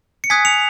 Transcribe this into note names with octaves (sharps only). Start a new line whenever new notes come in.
C#7
G#5 D#6 F#6 G#6 B6
C#7 F7